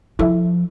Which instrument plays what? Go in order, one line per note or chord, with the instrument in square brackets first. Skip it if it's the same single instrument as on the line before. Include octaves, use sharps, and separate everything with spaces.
[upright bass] F3 [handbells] E4 A4 E5